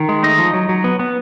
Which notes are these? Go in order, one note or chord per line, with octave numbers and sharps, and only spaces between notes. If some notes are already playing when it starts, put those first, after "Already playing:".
Already playing: D#3
G#3
A3 D#4 D#5
F3
F#3
F#3
B3
B3